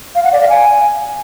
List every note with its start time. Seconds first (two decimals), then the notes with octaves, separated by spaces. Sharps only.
0.15 F5
0.24 F#5
0.32 D5
0.41 F5
0.50 G#5